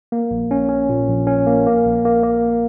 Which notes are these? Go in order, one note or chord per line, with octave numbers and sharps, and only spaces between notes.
A#3
A#1
C#4
C#4
A#2
A#1
C#4
A#3
A#3
A#1
A#3
A#3